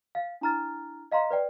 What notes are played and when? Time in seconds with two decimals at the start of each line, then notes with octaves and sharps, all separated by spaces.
0.15 F5 A6
0.41 D4 E4 A#5 F6 A6
1.12 D#5 F5 A#5 C6
1.30 B4 D5 G5